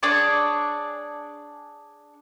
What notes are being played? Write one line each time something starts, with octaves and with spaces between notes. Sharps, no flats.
D4 G#4 C#5 D5